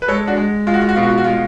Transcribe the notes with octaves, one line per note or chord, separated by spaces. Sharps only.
B4
G#3 A4 C#5
D4 F#4
G#3
G#3 F4
F#4
F4
F#4
B2 F4
F#4
F4
F#4
G#3 F4